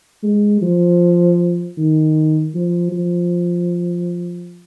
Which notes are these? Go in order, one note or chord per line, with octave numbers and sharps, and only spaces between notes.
G#3
F3
D#3
F3
F3